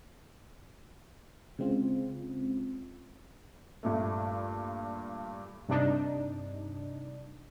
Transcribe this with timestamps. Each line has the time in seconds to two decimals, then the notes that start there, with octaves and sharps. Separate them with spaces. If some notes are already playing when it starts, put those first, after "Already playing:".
1.59 C#3 G#3 C4 F4
3.83 G2 A#2 A3
5.69 G2 C3 D4 D#4